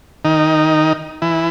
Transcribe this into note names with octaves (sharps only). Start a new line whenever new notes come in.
D#3 D#4
E3 E4